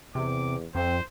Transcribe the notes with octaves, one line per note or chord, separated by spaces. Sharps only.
E2 C3 D6
F2 C4 C5